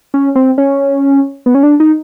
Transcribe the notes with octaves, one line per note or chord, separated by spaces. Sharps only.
C#4
C4
C#4
B3
C#4
D4
D#4